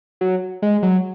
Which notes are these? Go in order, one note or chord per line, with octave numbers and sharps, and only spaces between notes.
F#3
G#3
F#3